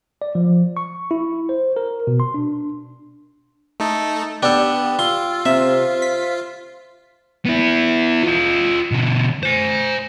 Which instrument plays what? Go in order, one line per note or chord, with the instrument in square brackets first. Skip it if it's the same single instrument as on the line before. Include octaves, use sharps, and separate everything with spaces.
[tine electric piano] D5
F3
C#6
E4
C5
A#4
B2
C6
D4
[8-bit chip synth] A3 D#4 A4
[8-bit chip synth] B3 [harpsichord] D4 A4 [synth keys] G4
[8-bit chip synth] F4 [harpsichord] C6 [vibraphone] E6
[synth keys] C3 [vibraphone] C5 [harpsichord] E5
[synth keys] B6
[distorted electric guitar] B3 E4
F4 D#5
B2 D3
C5 G#5